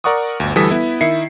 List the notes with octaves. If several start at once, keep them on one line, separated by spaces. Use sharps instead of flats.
A#4 D5 F#5 C#6 D#6
G1 D2
D2 E3 G3 A4 D#6 B6
B3 E4
D#3 E4 E5 C7 C#7